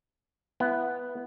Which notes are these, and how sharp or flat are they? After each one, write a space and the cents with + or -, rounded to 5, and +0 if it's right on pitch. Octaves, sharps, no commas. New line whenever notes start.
B3 +0 E4 +20